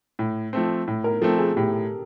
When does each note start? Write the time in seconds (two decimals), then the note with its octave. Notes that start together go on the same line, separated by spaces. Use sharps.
0.19 A2
0.53 F3 A3 C4
0.88 A2
1.04 A#4
1.21 F3 A3 C4 A4
1.38 G#4
1.56 A2 G4